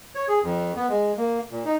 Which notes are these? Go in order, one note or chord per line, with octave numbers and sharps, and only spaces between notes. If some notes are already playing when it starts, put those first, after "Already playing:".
C#5
G#4
F2
B3
G#3
A#3
A#2
D#4